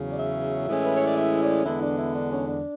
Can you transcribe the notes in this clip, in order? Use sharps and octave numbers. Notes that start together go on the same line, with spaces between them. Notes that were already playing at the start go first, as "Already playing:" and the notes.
Already playing: E2 C#3 F#3
D5
E5
A2 E3 G#3 C#4
B4
C#5
D5
E5
D5
E2 D3 G#3 B3 E4
D4
E4
D4
C#4
D4